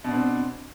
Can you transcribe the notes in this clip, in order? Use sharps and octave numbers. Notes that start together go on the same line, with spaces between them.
B2 C4 D4